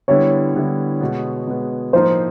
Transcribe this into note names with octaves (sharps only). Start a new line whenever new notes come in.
D3 G3 B3 E4 C#5
D3 G3 B3 E4
B2 G#3 B3
B2 G#3 B3
A2 F3 A#3 D#4 C5